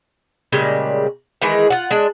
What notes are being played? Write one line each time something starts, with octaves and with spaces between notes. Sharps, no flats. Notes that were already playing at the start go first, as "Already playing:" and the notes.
A#2 C#3 G3 G#3
D#3 E3 G#3 G#4
F4 F#5
G#3 D4